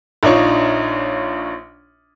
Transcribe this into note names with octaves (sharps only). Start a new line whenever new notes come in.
A#1 D4 D#4 F4 C#5 C#6